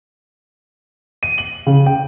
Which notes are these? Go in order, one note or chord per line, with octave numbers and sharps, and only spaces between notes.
D#7
F#7
C#3
G5